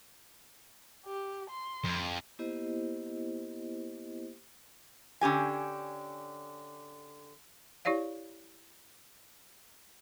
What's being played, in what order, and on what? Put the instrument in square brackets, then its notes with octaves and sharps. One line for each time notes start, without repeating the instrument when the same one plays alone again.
[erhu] G4
C6
[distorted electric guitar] F2
[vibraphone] A#3 B3 E4 G4 C5 D#5
[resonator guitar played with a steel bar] D3 C#4 G4 G#5
[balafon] E4 G4 C#5 D5 F5